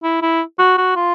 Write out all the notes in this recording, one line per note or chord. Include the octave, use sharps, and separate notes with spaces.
E4
E4
F#4
F#4
F4